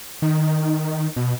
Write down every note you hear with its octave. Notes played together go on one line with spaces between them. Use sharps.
D#3
B2